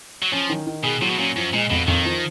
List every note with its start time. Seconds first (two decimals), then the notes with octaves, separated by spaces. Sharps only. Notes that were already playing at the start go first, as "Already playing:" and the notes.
0.22 F#3
0.32 F3 C#4
0.50 D#3
0.67 D#3
0.84 B2 G#4
1.02 A#2 F#3
1.11 B2
1.18 A#2 C#4
1.37 F#2 F3
1.53 A#2 G#3
1.71 F2 B2
1.88 F2 D#3
2.05 F3